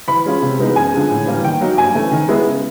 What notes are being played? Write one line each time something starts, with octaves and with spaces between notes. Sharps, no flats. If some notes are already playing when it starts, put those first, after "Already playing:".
E3 B5
G#3 C#4 F4
C3
E3 G#3 B3 D#4
F#2 G#5
D3 F3 G#3
A2
E3 G3 A#3
D#3 G5
F#3 A#3 D#4
G2 G#5
E3 A3 C#4
D#3
G#3 B3 E4
C#3